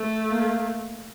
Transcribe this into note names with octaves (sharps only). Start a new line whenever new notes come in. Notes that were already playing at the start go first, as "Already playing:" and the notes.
Already playing: A3
A#3